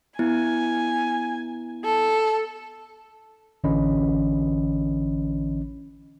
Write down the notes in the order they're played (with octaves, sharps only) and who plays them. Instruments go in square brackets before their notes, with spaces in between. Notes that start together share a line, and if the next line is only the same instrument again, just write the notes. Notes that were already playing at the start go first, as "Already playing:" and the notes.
[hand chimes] B3 E4 [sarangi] G#5
[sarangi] A4
[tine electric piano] A1 D3 E3 C#4 D#5 B5